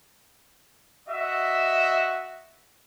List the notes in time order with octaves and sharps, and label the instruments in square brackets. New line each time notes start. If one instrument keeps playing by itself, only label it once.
[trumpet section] F#4 D#5 E5